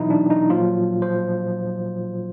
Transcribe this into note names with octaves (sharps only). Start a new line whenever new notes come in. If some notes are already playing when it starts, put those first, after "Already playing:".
Already playing: B2 E3 F#3 D#4 E4
D4
D#4
A#2 F3 F#3 F4
C5